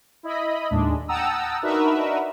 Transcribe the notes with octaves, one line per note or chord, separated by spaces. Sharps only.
E4 D#5 B5
D#2 A2 G#3 D4
F#5 G5 A5 A#5 D#6 E6
D4 D#4 F#4 A#4 B4 E5